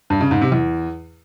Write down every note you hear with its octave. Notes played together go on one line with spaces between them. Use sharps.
G2
C#3
G#2
C3
E2